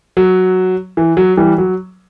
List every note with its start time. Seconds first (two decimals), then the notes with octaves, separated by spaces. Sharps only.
0.17 F#3
0.97 E3
1.17 F#3
1.37 E3 G3
1.58 F#3